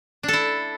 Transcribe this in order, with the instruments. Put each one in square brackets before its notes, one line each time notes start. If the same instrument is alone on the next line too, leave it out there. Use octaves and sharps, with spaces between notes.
[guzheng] D4
A4
E4